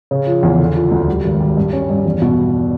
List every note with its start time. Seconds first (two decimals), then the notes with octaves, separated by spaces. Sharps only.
0.11 C#3
0.27 F3
0.43 E2
0.59 D3
0.75 F3
0.91 D2
1.08 G3
1.25 G#1
1.40 G3
1.57 G2
1.73 C#4
1.90 G2
2.06 E2
2.22 B2